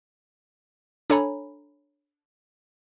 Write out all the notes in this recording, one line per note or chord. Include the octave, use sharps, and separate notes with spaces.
D4 A4 C#5 G#5 A#5 B5